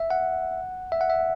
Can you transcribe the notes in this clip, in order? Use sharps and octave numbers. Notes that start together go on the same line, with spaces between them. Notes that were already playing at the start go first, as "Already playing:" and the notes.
Already playing: E5
F#5
E5
F#5
E5